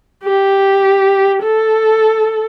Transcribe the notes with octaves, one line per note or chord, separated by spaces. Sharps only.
G4
A4